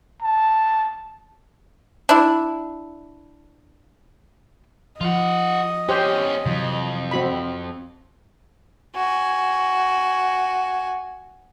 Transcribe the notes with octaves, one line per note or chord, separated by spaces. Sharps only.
A5
D4 E4
F3 F4 D#5 F#5
E2 C#4 G4 C5
F2 C3 E3 F#3
C4 F#4 B5
F#4 G#5